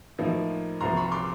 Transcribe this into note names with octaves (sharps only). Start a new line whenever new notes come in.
A2 F3 A#3 D#4
C2 A#2 F3 A#5 C6
B5 C#6
C6 D6